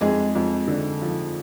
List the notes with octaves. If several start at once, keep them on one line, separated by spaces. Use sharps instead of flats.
F2 G#3 G#4
F2
D3
F3